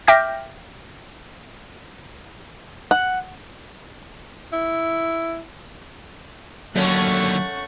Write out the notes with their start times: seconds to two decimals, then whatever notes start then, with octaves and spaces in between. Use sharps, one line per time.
0.07 E5 G5 D6 F6 G6 A#6
2.91 F#5
4.53 E4
6.76 D#2 D3 F#3 A3 C#4 F#5 C#6